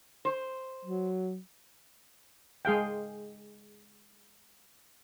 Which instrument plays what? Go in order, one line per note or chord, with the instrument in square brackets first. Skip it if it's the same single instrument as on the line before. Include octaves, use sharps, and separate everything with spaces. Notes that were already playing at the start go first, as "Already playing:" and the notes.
[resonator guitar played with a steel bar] C5
[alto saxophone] F#3
[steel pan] G#3 G#4 F5 G5